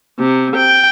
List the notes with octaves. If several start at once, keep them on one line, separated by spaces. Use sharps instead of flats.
C3
G5